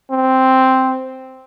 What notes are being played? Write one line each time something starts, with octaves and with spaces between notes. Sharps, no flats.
C4